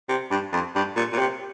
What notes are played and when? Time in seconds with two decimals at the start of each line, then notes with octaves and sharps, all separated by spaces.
0.09 C3
0.31 G2
0.52 F2
0.75 G2
0.96 A#2
1.12 A#2
1.19 C3